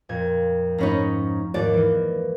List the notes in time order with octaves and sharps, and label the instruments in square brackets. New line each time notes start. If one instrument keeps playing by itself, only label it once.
[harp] F2 A#2 G#6
[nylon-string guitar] G#2 C#4 D#4 [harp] A#5 B5 C#6
[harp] D#2 G#2 [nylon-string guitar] D5
[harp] E3 A#3